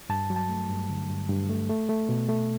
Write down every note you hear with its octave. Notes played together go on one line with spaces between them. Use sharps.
G2 A5
F#3
A5
A3
G2
D3
G2
G2
A3
A3
A3
B2
A3